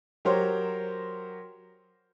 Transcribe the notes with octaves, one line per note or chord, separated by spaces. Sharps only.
F#3 G4 A#4 C5 C#5